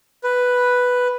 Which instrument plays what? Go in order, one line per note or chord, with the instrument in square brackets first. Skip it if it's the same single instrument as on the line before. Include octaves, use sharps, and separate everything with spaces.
[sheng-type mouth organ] B4